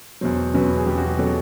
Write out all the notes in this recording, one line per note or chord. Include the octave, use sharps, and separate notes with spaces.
E2 B2 F#3 C5
E2 B2 F#3 B4
G#4
E2 B2 F#3 G4
F#4
G4
B2 F#3 A4